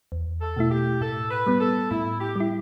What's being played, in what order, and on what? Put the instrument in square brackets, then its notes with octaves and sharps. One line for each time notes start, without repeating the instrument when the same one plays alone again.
[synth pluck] E2
[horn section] A4
[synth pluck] B2 A3 E4
[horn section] G4
[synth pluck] A2 [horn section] A4
[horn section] B4
[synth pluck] G3 B3
[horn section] A4
[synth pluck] A2 [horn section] E4
[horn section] G4
[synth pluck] G3 E4